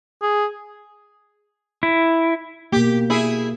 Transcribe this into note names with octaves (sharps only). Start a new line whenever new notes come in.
G#4
E4
B2 A#3 G4
E4 G#4